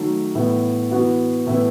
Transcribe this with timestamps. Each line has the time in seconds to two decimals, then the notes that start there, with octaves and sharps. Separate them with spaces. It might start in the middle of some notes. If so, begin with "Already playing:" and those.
Already playing: D#3 F#3 A3
0.35 A2 E3 B3 E4
0.91 E3 B3 F#4
1.47 A2 E3 B3 E4